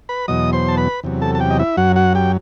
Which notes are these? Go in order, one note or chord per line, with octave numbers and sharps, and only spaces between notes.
B4 B5
E2 B2 F#3 D#5 D#6
C5 C6
A5
B4 B5
E2 C3 F#3
A4 A5
A5
G4 G5
D#5
E4 E5
F#2 F#3 F#4 F#5
F#4 F#5
G4 G5